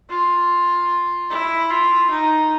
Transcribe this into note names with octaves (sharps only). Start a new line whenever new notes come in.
F4
E4
F4
D#4